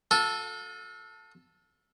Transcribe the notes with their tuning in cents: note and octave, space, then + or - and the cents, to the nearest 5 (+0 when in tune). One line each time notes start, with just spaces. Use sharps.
F4 +45 A4 +0